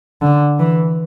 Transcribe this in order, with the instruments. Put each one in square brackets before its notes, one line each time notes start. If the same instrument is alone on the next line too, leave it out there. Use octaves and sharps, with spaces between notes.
[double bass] D3
E3